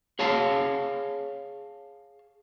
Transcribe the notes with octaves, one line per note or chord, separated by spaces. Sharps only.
G#4 C#5 F5 A5